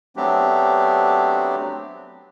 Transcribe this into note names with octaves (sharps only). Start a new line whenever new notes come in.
F#3 A3 B3 C4 D4 G4